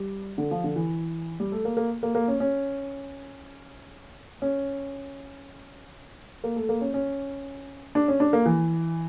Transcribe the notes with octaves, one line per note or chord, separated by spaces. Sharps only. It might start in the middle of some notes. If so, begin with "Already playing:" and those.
Already playing: G3
D3
F3
D3
E3
G3
A3
A#3
A#3
A#3
A#3
C#4
C#4
C#4
A#3
A3
A#3
C#4
C#4
D4
C#4
D4
A#3
E3